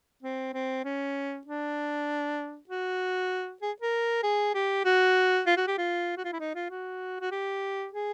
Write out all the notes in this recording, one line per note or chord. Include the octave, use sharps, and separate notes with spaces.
C4
C4
C#4
D4
F#4
G#4
A#4
G#4
G4
F#4
F4
F#4
G4
F4
F#4
F4
E4
D#4
F4
F#4
F#4
G4
G#4